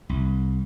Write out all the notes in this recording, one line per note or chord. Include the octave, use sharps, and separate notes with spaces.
C2